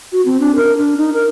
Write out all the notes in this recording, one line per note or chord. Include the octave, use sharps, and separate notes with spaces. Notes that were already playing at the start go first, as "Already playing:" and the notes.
F#4
C4
D4
A#4
D4
D#4
A#4